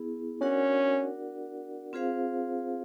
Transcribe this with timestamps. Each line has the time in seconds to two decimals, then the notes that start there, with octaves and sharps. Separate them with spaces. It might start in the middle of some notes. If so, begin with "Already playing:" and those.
Already playing: B3 E4 G#4
0.41 C#4 D4 F#4 A#4 D5 F#5
1.93 C4 F4 G#4 C5 F5